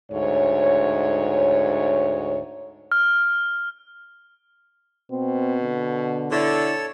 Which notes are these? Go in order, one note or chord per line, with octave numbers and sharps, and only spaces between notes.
D2 G#2 C#5
F6
B2 C4
D3
D3 E4 A4 C#5 E6